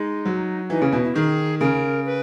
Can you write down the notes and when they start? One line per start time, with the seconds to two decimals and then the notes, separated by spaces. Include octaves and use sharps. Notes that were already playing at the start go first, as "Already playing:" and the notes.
Already playing: G#3 D#4
0.25 F#3
0.70 E3 D#4
0.81 C#3 C#4
0.92 B2 E4
1.04 E4
1.15 D#3 G#4
1.60 C#3 A#4
2.05 B4